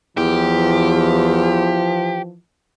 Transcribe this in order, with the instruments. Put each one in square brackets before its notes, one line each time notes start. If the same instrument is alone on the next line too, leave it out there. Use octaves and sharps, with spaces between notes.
[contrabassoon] E2 [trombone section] E3 F3 [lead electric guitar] G4